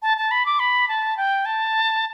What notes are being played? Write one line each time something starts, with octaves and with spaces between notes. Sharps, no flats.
A5
A5
B5
D6
B5
A5
G5
A5